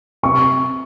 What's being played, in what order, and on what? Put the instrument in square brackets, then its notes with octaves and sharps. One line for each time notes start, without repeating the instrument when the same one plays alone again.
[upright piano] C3 [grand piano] C#6